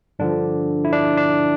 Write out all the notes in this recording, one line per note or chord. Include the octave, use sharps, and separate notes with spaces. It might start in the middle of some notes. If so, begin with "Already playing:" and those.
G2 D3 F3 D4
E4
D4
D4